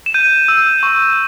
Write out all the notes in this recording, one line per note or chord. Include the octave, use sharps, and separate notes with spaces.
E7
G6 D#7
E6
C#6